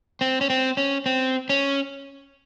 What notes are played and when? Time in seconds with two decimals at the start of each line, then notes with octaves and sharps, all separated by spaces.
0.21 C4
0.41 C#4
0.50 C4
0.77 C#4
1.06 C4
1.50 C#4